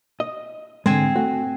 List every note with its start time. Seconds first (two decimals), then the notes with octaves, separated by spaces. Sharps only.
0.20 D#5
0.86 G#2 D3 G#3 C4 G#5
1.16 A3 F#4